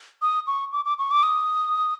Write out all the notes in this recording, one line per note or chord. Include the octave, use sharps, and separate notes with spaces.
D#6
C#6
D6
D6
C#6
D6
D#6